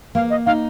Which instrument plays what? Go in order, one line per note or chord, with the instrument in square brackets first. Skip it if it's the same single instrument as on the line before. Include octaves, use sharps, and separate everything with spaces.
[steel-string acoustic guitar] A#3 [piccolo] F5
[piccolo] D#5
[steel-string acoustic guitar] D#4 [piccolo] F5